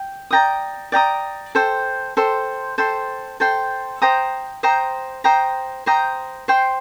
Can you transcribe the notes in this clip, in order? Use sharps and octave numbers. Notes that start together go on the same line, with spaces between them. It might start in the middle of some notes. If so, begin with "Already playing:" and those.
Already playing: G5
D5 G5 A#5 D#6
D5 G5 A#5 D#6
A4 C5 G5 C6
A4 C5 G5 C6
A4 C5 G5 C6
A4 C5 G5 C6
C5 G5 A#5 D#6
C5 G5 A#5 D#6
C5 G5 A#5 D#6
C5 G5 A#5 D#6
C5 G5 C6